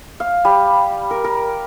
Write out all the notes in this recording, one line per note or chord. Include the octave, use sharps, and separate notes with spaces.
F5
G3
A#4
A#4